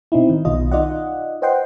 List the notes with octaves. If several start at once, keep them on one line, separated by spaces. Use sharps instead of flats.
B2 C4 D#4 E4
D#3
B1 B2 D#3 F4 D#5
D#4 F4 D5 D#5 F#5
B4 C5 D#5 F#5 G5 C6